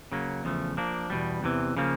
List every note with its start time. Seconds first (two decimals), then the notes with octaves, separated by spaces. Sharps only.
0.12 C#3 F#3 A#3 C#4
0.44 E2 C#3 F3 A3
0.77 F3 A#3 D4
1.10 E2 B2 G3
1.43 E2 C3 E3
1.77 C#3 F3 A#3